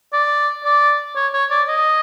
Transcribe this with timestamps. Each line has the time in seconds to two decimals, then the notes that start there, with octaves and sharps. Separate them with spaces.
0.13 D5
0.64 D5
1.15 C#5
1.33 C#5
1.50 D5
1.68 D#5